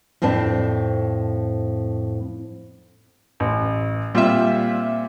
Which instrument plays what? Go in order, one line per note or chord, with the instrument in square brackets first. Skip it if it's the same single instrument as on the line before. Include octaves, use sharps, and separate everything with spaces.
[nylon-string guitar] F2 A2 C4 D4 A5
[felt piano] A1
[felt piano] A#2 C4 [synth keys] G3 F4 E5